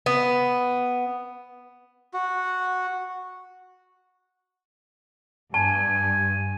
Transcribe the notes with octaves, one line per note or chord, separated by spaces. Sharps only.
B3
F#4
G2 G#5 A5